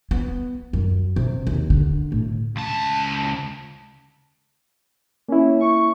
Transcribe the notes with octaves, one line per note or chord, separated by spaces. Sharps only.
B3
F#2
C3
D#2
D3
A2
C#2 A5
A#3 C#4 E4
C#6